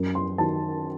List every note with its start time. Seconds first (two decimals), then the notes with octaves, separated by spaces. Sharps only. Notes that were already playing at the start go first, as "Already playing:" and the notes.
Already playing: F#2
0.15 C6
0.38 D#3 F#3 A5